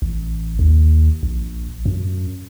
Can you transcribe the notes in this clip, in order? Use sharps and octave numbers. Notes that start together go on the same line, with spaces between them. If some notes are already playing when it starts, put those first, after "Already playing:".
A1
D#2
A#1
F#2